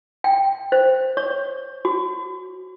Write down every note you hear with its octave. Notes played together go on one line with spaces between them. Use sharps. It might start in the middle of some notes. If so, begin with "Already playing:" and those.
G5
C5
C#5
F#4